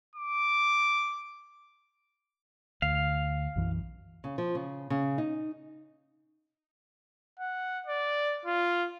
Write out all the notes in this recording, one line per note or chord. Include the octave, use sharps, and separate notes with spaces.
D6
D2 F5
B1 F#2 E3
C#3
F3
C#3
C#3
D#4
F#5
D5
F4